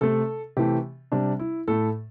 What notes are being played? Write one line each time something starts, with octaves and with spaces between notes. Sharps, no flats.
C3 A3 A4
C3 E3 A3 G4
C3 G3 D4
E4
A2 A3 A4